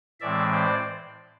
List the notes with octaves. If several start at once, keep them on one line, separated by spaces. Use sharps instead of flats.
A2 E3 G#3 C4 D5 E5
C5 D5